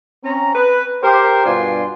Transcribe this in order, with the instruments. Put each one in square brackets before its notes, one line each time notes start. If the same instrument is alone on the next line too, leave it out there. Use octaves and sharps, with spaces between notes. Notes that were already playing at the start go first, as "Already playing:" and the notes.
[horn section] C4 C#4 A#5
B4
G4 A#4 C5
G2 B2 D4 F4 G#5 C6